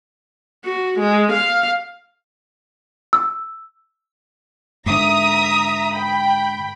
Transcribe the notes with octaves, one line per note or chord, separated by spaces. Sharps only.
F#4
G#3
F5
E6
G#2 D3 E5 A#5 D#6
G5 B5